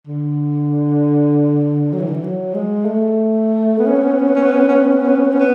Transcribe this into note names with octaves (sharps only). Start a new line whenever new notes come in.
D3
F#3
E3
D3
E3
F#3
G#3
A3
B3
C#4
B3
C#4
B3
C#4
B3
C#4
B3
C#4
B3
C#4
B3
C#4
B3
C#4
B3
C#4
B3
C#4
B3